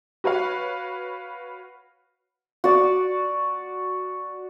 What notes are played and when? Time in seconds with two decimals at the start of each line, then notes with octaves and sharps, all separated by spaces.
0.24 F#4 B4 C#5 F5
2.64 F#4 D5